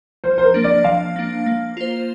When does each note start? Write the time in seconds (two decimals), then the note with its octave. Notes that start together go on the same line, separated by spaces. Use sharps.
0.24 F3 C5
0.38 C5
0.44 A#4
0.54 A#3 D4
0.64 D5
0.84 F3 F5
1.16 A#3 D4
1.46 A#3
1.77 F4 C5